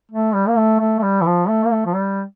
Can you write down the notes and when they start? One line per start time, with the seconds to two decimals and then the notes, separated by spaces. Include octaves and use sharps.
0.12 A3
0.34 G3
0.48 A#3
0.57 A3
0.79 A3
0.99 A3
1.03 G3
1.21 E3
1.26 F3
1.48 A3
1.65 A#3
1.72 A3
1.86 F3
1.95 G3